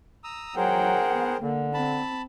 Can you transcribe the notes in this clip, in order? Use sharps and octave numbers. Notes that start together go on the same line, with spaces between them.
A#5 D#6 E6
F#3 G#4 A#4 C5 F#5 G5
B3
D3 A#3
C4 A5 B5